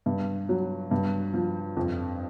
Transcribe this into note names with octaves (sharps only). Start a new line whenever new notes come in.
G2
F#3
G2
F3
F2